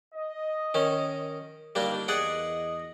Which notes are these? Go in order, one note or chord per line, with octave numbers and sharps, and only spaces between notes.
D#5
D#3 C#4
G1 D#3 G3 A#3 D4
E2 G#4 D5 D#5 F#5